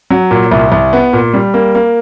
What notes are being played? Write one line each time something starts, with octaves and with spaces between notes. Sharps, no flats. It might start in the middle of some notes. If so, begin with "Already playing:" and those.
F#3
A#2
C2
C2
B3
A#2
G3
A#3
A#3